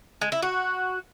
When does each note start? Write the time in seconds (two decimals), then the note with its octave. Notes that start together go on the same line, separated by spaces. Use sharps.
0.21 G#3
0.32 E4
0.43 F#4